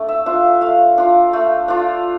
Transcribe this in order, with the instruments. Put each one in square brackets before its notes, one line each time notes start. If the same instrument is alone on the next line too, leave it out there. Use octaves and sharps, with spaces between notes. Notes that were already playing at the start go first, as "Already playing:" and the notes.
Already playing: [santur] A3 D4
E5
D4 F4 E5
A3 F5
D4 F4
A3
D4 F4